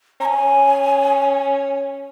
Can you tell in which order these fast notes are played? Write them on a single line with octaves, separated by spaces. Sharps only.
C#4 A#5 G#5